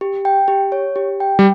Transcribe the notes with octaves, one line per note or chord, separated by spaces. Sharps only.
G4
G5
G4
C#5
G4
G5
G3